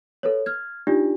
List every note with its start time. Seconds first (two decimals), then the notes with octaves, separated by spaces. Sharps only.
0.23 A4 B4 C#5
0.46 F6 G#6
0.87 D4 D#4 F4 G4 D5